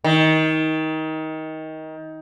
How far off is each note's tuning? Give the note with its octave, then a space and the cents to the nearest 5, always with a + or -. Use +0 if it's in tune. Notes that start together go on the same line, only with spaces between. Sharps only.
D#3 +20